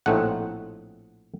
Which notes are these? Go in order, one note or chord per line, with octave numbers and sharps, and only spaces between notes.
A#1 A2 A3 C4 D#4 F#5